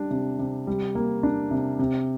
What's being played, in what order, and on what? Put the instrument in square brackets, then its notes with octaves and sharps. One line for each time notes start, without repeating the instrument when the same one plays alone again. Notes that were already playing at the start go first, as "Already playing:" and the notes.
Already playing: [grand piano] G3 D4
C3
C3
G3
A#3
D4
C3
C3